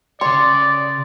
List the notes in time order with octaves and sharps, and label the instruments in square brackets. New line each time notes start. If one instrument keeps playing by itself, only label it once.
[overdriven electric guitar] C#3 C#5 [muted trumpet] D5 [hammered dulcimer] C6